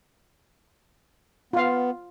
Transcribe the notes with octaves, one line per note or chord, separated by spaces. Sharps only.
B3 F4 F5